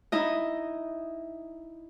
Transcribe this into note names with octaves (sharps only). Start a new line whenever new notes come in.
D#4 E4 D#5